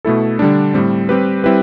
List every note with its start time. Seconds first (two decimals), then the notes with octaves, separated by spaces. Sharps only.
0.05 B2 A3 E4 A4
0.39 D3 G3 D4
0.74 A2 G3 C4
1.09 G3 C4 G4 B4
1.44 G3 C4 E4 G4 B4